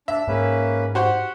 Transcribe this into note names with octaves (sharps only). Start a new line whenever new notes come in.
D4 E5
G#2 A#3 C#4 B4
F#4 G4 C5 F#5